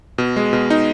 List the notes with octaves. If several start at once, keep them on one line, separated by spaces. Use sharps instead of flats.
B2
G#3
B2
D#4